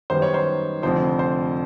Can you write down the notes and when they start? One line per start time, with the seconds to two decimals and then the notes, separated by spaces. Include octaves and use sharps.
0.10 F#2 D#3 G3 B3 C5
0.22 C#5
0.34 C5
0.83 F1 F2 D3 F3 C5
1.19 C5